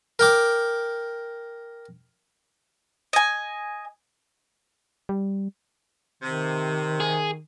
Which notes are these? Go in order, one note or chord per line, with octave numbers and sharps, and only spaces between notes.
A#4 G5 D6
D#5 G#5
G3
C3 D#3
G#4